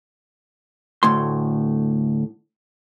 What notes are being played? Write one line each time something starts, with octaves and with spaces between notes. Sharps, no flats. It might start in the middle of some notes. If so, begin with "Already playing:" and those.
D2 A2 C6